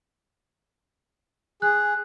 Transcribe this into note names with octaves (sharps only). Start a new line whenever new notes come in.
G#4 F#6